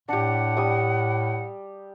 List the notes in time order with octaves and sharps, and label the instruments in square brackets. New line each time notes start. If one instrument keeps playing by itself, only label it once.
[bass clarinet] A2 [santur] D4 G4 [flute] F#5
[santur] G3 D#6